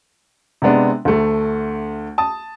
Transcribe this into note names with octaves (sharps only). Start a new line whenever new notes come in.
C3 G#3 B3 D4
D2 A3
A5 D#6